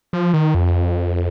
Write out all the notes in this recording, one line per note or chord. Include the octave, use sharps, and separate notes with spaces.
F3
D#3
F2